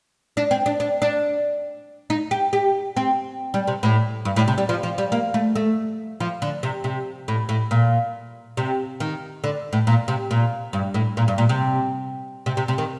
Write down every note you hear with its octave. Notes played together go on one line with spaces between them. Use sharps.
D4
C4
D4
D4
D4
D#4
G4
G4
C4
G3
C3
A2
G2
A2
C3
G3
F3
F3
G3
A#3
A3
A3
F3
D3
C3
C3
A2
A2
A#2
C3
D#3
D3
A2
A#2
C3
A#2
G2
A2
A#2
G2
A#2
C3
C3
C3
C3
D#3